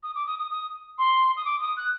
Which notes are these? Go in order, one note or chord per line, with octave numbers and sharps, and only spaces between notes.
D#6
D6
D#6
D#6
D#6
C6
D#6
D6
D#6
F#6